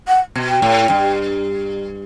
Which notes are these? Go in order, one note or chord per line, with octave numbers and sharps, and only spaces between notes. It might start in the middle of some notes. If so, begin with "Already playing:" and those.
F#5
B2
G5
A2
G2